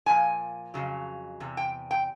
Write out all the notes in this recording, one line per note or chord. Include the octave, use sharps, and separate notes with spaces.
A#2 F3 G#5
F2 C#3 F#3
E2 C3
G5
G5